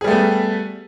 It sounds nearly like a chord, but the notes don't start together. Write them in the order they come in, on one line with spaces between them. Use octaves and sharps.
G#4 G3 A3 B3